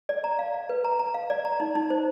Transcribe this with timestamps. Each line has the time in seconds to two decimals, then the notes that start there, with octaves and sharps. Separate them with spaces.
0.09 D5
0.24 A#5
0.39 F5
0.54 F5
0.69 B4
0.84 A#5
0.99 A#5
1.14 F5
1.30 D5
1.45 A#5
1.60 D#4
1.75 D#4
1.90 C5